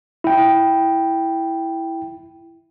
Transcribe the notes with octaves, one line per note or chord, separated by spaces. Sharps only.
E4 G5